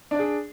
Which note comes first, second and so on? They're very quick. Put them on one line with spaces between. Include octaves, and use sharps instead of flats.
D4 D5 G#4